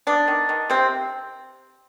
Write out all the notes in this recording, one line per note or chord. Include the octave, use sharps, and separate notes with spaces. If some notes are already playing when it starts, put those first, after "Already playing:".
B3 D4
D#3
D#3
C3 C4